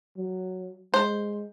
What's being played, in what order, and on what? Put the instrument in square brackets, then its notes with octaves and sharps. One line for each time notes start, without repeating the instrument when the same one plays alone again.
[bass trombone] F#3
[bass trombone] G#3 [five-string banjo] C5